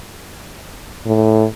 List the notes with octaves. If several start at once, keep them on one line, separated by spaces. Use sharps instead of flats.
A2